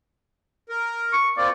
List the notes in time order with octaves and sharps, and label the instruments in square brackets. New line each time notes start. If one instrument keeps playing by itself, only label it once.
[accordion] A#4
[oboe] C#6
[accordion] A#3 C4 F4 [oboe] D5